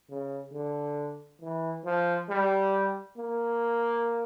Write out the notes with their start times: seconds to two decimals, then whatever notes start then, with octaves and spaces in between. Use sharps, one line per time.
0.10 C#3
0.53 D3
1.41 E3
1.85 F3
2.29 G3
3.17 A#3